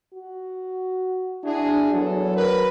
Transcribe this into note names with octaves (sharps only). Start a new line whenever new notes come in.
F#4
D4 E4 F#4 G#4
E2 F#3 A4
A#4 B4